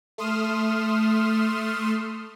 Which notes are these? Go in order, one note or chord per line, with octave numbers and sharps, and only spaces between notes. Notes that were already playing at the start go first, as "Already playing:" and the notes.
A3 C6 D#6 F6 E7